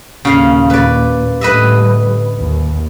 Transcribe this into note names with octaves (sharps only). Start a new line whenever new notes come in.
D#2 A#2 C#3 F5
B4 D5
A2 D3 G3 B4 D#5 E5
D#2